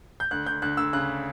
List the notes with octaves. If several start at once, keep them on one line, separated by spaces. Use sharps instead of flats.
G6
D2 F#6
D2 G6
D2 F#6
D2 E6
C#3 F#6